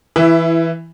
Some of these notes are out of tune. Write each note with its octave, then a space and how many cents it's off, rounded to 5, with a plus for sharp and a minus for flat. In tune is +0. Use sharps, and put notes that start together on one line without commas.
E3 +0 E4 +20 E5 -5